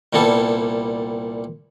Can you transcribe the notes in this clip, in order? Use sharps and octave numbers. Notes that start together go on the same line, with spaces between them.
C2 A#2 G3 B3 A4